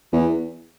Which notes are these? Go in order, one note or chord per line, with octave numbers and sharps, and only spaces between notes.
E2